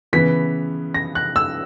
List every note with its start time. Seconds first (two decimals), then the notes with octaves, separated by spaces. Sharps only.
0.13 C#3 E3 B3 B6
0.94 A#6
1.15 F#6
1.36 E6